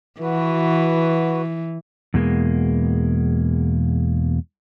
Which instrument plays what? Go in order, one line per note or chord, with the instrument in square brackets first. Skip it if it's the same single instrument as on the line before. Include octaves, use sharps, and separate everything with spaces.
[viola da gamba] E3 [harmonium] F#4 B4
[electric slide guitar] E2 B2 G#3 A#3